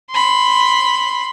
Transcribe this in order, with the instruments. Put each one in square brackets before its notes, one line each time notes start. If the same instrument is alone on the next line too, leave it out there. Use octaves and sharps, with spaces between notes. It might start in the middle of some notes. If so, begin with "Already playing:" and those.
[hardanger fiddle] B5 C6